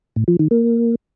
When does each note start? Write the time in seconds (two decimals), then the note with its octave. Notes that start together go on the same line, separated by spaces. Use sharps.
0.16 A2
0.28 F3
0.39 D#3
0.51 A#3